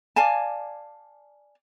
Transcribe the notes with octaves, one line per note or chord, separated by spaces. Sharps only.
D5 F5 G#5 A5